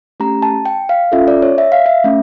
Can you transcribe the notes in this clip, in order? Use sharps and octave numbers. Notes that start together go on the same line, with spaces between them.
A3 C#4 G4 A#5
A5
G5
F5
C#4 F4 A4 E5
D5
C#5
E5
F5
E5
A3 C#4